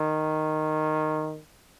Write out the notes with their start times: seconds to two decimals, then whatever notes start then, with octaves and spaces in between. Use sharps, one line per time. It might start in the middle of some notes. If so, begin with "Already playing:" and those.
Already playing: D#3